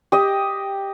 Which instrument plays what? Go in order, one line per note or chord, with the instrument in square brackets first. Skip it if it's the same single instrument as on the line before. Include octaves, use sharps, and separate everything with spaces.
[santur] G4 D#5